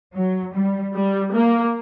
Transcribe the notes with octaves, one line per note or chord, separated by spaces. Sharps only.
F#3
G3
G3
A#3